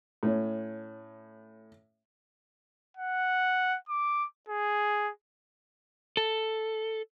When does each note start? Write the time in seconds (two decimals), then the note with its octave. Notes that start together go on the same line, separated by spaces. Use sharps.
0.23 A2 C#4
2.97 F#5
3.89 D6
4.49 G#4
6.17 A4